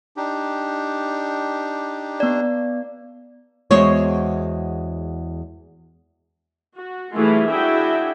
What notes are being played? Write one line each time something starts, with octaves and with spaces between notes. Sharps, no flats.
D4 D#4 G4
B3 D5
E2 G#3 F#4 C5 C#5
F#4
E3 G3 A3 E4 F4 G#4
D4 E4 F#4 G#4 E5 G5